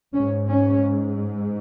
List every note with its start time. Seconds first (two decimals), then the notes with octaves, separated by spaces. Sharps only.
0.14 G#2 C#4
0.47 C#4